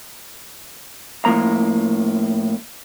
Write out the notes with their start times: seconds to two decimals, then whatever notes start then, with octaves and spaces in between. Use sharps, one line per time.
1.25 A2 F3 A#3 A#5